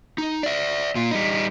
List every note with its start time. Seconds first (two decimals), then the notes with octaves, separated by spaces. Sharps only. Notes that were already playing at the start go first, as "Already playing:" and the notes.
0.18 D#4
0.43 D5 E5
0.95 A#2 F4
1.11 G3 D#4